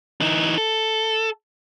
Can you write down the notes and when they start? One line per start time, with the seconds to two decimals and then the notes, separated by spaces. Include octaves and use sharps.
0.21 E3 D#4
0.58 A4